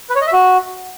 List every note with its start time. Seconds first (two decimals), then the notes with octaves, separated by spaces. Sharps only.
0.10 B4
0.16 C#5
0.21 D#5
0.27 E5
0.33 F#4